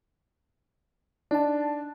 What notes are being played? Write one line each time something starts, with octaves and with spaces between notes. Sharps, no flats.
D4 D#4 A5